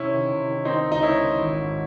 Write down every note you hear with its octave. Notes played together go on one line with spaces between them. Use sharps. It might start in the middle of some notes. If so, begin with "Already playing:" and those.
Already playing: C3 C#4 E4
D#3
C3
D#3
D#3 C4 D#4
C#2
D#4
D#3 C#4 E4
D#3
G#1
G#2